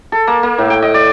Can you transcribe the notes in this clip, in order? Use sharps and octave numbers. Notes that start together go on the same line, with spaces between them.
A4
A#3
A#3
A2
G5
D#5
D5